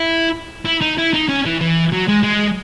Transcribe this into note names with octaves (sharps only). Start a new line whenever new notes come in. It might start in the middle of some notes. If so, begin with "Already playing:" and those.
Already playing: E4
E4
D#4
E4
D#4
C#4
E3
E3
F#3
G#3
G#3